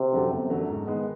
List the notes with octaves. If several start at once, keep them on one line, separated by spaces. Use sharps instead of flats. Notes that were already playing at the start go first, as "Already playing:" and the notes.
Already playing: C3
F#2 D3 F#3 A3
G1
F#2 D3 F#3 A3
G#2
D#3 G#3 B3